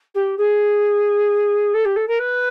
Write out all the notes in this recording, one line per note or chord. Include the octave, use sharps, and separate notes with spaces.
G4
G#4
A4
G4
A4
A#4
B4